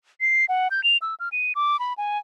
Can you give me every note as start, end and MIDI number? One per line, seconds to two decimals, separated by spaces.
0.21 0.45 96
0.49 0.68 78
0.71 0.83 91
0.84 0.97 101
1.02 1.15 88
1.20 1.29 89
1.32 1.53 99
1.55 1.79 86
1.79 1.93 83
1.98 2.18 80